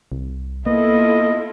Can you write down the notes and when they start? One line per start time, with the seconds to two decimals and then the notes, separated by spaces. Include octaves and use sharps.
0.12 C2
0.66 A#3 B3 E4 F4 A4 D#5